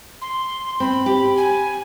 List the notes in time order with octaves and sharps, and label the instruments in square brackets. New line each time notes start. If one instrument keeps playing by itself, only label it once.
[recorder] C6
[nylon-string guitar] C4 [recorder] B5
[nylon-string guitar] G4
[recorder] G#5